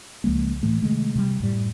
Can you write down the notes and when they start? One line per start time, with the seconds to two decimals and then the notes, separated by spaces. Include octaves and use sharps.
0.24 C#2 F3 G#3 A#3
0.63 A2 E3 A3
0.82 C3 D#3 G#3 A3
1.16 C3 G3
1.40 F#2 A2 G3